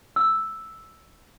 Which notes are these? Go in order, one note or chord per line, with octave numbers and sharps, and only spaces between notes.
E6